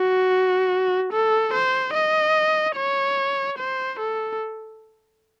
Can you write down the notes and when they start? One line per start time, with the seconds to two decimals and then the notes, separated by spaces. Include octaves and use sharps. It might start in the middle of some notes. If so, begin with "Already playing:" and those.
Already playing: F#4
1.13 A4
1.53 C5
1.94 D#5
2.76 C#5
3.58 C5
3.99 A4